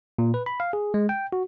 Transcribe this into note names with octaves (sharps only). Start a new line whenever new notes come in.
A#2
B4
B5
F5
G#4
G#3
G5
F#4